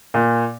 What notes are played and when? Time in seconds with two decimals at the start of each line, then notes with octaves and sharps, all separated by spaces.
0.14 A#2